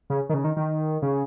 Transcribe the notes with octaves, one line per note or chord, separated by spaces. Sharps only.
C#3
D#3
C#3
D#3
D#3
C#3